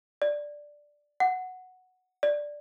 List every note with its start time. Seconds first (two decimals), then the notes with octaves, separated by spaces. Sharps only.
0.22 D5
1.20 F#5
2.23 D5